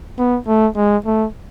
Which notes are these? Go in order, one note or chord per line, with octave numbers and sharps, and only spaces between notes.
B3
A3
G#3
A3